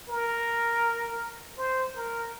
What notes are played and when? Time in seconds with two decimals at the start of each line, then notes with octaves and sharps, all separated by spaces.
0.09 A#4
1.58 C5
1.96 A#4